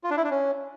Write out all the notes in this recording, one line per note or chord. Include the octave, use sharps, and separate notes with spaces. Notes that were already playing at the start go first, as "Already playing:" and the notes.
F4
D4
E4
D4
C#4